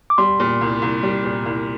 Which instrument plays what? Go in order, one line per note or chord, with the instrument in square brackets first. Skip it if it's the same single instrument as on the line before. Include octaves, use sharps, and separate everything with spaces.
[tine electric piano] D6
[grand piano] G3 [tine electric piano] C6
[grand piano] A#2
C2
C2
G3
A#2
C2